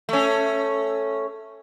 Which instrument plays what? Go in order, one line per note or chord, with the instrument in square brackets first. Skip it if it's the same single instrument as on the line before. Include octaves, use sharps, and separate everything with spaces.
[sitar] A3 C#4